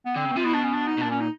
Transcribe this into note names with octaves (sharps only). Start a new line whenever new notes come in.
B3
D3 C4
C#3
B2
C3 F4
B2 E4
D4
C#4
D4
D#4
B2
A#2 D4
C#4
D#4